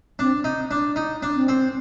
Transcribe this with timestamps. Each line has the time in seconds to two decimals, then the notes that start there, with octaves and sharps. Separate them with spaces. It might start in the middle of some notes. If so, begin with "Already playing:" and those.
0.19 C4 D4
0.44 D#4
0.71 D4
0.96 D#4
1.23 D4
1.35 C4
1.48 C4